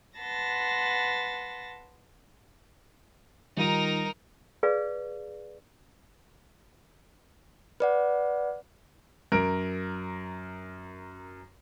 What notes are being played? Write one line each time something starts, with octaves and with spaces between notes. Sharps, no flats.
B4 F#5 A5 C6 A6 A#6
D#3 G3 D#4 F4 A#4 D#7
G#4 B4 D5 F5
B4 D5 F#5
F#2 A#4 D7